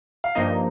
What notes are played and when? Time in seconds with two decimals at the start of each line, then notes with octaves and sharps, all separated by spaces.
0.24 F5
0.35 G2 F3 A#3 D#4 D#5